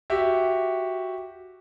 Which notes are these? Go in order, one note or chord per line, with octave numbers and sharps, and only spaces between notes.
F#4 G4 E5